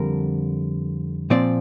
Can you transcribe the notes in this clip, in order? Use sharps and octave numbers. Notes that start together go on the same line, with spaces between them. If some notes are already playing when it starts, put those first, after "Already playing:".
Already playing: F2 D3 G3 A#4
A#2 F3 C4 D5